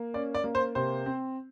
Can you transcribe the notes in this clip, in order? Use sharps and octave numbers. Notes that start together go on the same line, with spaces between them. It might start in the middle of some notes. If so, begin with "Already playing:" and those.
Already playing: A#3
C#4 D5
D5
A#3
C5
C3 C5
C4